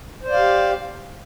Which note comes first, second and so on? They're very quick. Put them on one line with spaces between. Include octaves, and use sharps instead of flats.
C5 D5 F5 G4